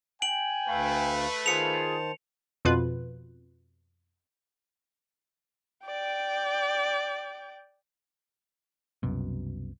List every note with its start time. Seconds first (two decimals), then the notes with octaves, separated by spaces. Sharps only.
0.22 G5 G#5 D7 F#7
0.68 D2 A3 B4 F5
1.46 D#3 F4 G#4 C5 A5 C#7 F7
2.65 F2 B2 F4 B4
5.86 D5 G5
9.03 C2 F#2 B2